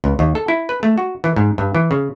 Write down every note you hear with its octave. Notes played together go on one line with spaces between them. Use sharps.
C#2
D#2
A4
E4
B4
A3
F#4
E3
G#2
G2
E3
C#3